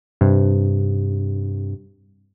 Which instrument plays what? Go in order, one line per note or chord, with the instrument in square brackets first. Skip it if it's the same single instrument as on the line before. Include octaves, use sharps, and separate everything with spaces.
[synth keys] G2 C3